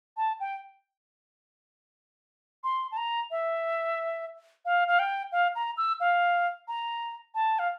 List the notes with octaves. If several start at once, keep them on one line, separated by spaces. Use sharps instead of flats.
A5
G5
C6
A5
A#5
E5
F5
F5
G5
F5
A#5
E6
F5
A#5
A5
F5